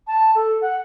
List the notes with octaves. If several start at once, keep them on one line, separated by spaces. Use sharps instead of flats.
A5
A4
F#5